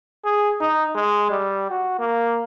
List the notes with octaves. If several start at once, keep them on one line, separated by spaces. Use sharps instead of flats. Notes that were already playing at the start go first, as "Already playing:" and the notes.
G#4
D#4
G#3
G3
F#4
A#3